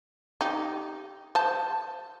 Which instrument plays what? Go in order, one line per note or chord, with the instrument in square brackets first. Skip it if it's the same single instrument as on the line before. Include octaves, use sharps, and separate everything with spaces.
[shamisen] D#4 G4
C5 A5